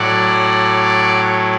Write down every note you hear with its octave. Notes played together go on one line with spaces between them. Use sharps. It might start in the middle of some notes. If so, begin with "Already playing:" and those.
Already playing: A2 F#3 D5 F#5